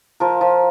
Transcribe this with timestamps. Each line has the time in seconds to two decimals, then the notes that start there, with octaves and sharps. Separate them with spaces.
0.20 F3 A#4
0.41 F3